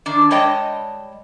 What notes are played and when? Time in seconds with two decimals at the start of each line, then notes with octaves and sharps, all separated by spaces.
0.06 D#3 D4
0.31 G3 G#3 C#5 D#5 G5 A5